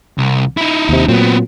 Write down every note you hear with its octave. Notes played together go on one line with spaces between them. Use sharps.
C2
D#4 E4
D#2 C3
A#2 F#3 B3 C4